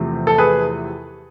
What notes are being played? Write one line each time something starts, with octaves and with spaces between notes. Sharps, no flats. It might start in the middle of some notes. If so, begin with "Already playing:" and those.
Already playing: E2 C3 F3 A3 C4
A4
G#4 B4